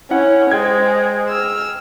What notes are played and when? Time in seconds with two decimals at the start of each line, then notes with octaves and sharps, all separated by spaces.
0.11 C#4 E4 F#5
0.52 G#3 G#4 C5 G5 G#6
1.29 E6 F6